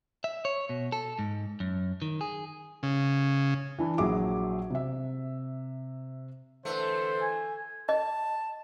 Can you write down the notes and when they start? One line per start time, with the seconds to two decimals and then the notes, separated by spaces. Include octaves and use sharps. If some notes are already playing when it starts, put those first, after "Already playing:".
0.24 E5
0.45 C#5
0.69 B2
0.92 A4
1.19 G#2
1.60 F#2
2.02 D#3
2.21 G#4
2.83 C#3
3.79 E3 D4 E4
3.98 A#1 F#3 G#4 E5 D6
4.70 C3 E5
6.65 D3 E3 A3 C5
7.22 G#5
7.89 D#5 A5